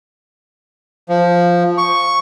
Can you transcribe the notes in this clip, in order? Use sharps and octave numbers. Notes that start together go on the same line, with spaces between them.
F3
C#6